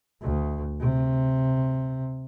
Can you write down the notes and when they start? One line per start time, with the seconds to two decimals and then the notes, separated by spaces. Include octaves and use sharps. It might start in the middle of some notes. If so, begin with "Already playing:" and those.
0.22 D2
0.80 C3